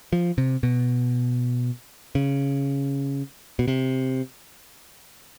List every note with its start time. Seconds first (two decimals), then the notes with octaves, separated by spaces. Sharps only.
0.13 F3
0.38 C3
0.63 B2
2.15 C#3
3.59 B2
3.68 C3